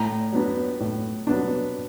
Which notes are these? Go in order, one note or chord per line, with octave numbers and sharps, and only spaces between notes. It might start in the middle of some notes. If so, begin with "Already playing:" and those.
Already playing: A2 A#5
F#3 B3 D4
A2
F#3 B3 D4